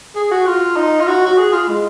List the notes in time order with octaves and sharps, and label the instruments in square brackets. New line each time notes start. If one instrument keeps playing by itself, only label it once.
[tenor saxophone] G#4
F#4
F4
D#4
F4
F#4
F#4
G#4
F4
G#3